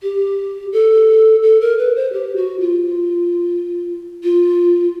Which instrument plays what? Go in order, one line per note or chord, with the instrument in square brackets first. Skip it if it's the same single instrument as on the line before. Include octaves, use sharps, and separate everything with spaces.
[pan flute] G4
A4
A4
A#4
B4
C5
G4
F#4
F4
F4